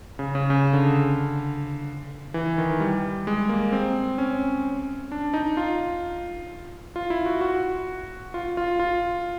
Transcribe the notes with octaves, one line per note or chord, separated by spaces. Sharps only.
C#3
C#3
C#3
D3
E3
D#3
G3
G#3
A#3
C4
C#4
D4
D#4
F4
F4
E4
F#4
F#4
F4
F4
F4